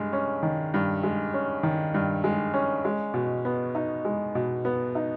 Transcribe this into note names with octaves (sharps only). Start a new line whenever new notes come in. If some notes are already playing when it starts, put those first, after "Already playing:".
Already playing: G2 G#3
C#4
D#3
G2
G#3
C#4
D#3
G2
G#3
C#4
G#3
B2
B3
D#4
G#3
B2
B3
D#4